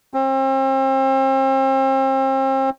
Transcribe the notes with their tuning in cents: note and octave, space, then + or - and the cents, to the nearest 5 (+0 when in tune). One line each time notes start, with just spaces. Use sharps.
C4 +35